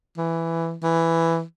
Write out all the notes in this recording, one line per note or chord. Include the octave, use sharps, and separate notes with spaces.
E3
E3